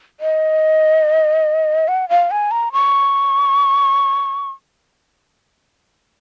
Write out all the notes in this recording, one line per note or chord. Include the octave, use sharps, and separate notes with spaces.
D#5
F#5
F5
G#5
A#5
C#6